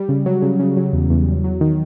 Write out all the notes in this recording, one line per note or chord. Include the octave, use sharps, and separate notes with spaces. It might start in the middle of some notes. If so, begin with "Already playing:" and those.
Already playing: G3
C#3
F#3
C#3
C#3
F#3
E2
E2
E2
F#3
D#3